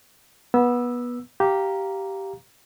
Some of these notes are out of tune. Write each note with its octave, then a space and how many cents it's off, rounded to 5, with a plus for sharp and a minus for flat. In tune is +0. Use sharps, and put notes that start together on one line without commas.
B3 -20 E6 +0
G4 -10 F5 +0 A#5 +0